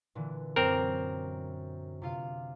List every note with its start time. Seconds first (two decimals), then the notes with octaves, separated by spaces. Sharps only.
0.15 A#2 D3 E3
0.56 F#2 C4 A#4 D6 E7
2.02 C3 F4 F5